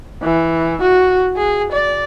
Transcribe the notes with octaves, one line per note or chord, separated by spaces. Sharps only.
E3
F#4
G#4
D5